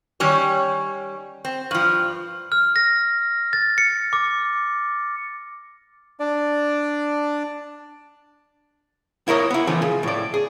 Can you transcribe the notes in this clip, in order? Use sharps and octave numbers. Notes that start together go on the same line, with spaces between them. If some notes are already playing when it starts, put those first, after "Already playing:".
D#3 G3 C#4 C#5
C4
G2 F3
F6
A#6
A6
C#7
D6
D4 D5
E4 A#4 C#5 D#5
B3 E4
E3 F3 A3 C#4
C#3
A2 D5
G#4